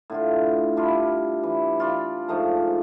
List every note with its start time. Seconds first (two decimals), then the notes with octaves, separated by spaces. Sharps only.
0.10 A2 D3 F4
0.77 G3 D4 E4 F4
1.43 E3
1.80 F4 D5 B5
2.28 G#2 F3 A3 A#5